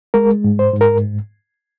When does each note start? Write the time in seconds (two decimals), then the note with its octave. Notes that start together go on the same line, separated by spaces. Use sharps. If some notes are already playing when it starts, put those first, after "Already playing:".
0.14 G#3 A#4
0.44 G#2
0.59 C5
0.73 G#2
0.81 A#4